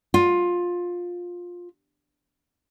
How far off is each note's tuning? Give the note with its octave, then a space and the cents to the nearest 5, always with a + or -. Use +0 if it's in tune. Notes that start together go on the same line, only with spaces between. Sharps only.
F4 +15